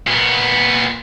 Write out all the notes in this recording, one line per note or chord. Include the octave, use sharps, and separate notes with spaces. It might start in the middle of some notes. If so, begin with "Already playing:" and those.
A#2 B3